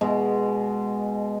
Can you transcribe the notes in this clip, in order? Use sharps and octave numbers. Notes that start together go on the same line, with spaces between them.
B2 G#3